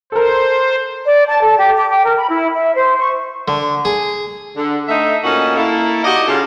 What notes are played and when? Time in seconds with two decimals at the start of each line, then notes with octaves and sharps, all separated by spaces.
0.12 A4 A#4 C5
1.05 D5
1.28 A5
1.43 A4
1.59 G4
1.78 D6
1.90 G5
2.04 A#4
2.16 B5
2.29 E4
2.55 E5
2.75 C5
2.99 C#6
3.48 D3
3.85 G#4
4.56 D3
4.88 A3 D4 D#4 E5
5.23 A#2 C#4 D#4 F#4 A4 F#5
5.56 A#3 E4 A4
6.04 D#4 F#4 G4 D5 D#5
6.27 C#3 F4 A4